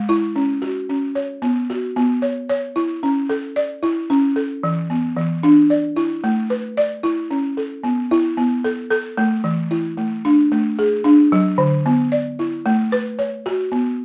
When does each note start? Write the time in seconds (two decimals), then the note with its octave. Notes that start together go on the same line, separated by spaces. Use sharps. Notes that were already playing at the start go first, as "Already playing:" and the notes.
Already playing: G#3
0.09 E4
0.36 C#4
0.62 F#4
0.89 C#4
1.15 C#5
1.42 B3
1.70 F#4
1.97 B3
2.22 C#5
2.49 C#5
2.76 E4
3.03 C#4
3.29 A4
3.56 D5
3.83 E4
4.10 C#4
4.36 A4
4.63 E3
4.90 B3
5.17 E3
5.43 D4
5.70 D5
5.96 E4
6.24 A3
6.50 B4
6.77 D5
7.03 E4
7.30 C#4
7.57 A4
7.84 B3
8.11 E4
8.38 B3
8.64 A4
8.90 A4
9.17 A3
9.44 E3
9.71 E4
9.97 A3
10.25 D4
10.52 A3
10.79 G#4
11.04 D4
11.32 F#3
11.58 D3
11.86 B3
12.12 D5
12.39 E4
12.66 A3
12.92 B4
13.19 C#5
13.46 F#4
13.72 B3